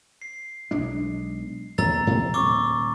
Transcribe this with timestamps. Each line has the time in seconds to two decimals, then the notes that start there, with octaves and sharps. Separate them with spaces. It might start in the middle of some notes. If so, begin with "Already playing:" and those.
0.22 C7
0.71 B1 G#3 D4
1.78 D#2 A#5 E6 A6
2.07 F2 C3 F3
2.34 D#1 C#6 D6 E6